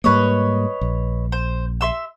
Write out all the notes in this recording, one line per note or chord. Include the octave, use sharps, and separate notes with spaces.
G#2 G3 A#3 B4 C#5 D#5
A#1
C5
E5 C6 E6